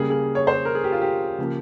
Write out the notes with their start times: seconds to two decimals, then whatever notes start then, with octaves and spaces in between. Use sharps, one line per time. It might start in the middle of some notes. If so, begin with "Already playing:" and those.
Already playing: C#3 G3 A#3 G#4
0.10 G#4
0.35 C#5
0.47 C5
0.65 A#4
0.75 G#4
0.84 G4
0.92 F4
1.02 G4
1.38 C#3 F3 A#3